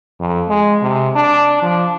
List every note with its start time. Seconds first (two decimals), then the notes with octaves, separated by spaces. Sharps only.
0.20 F2
0.49 G#3
0.82 C3
1.16 D4
1.62 F3